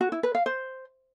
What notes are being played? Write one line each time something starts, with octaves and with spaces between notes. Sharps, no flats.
F#4
E4
B4
F5
C5